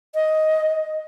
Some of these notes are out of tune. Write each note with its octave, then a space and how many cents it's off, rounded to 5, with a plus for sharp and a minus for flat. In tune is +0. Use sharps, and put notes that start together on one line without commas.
D#5 +10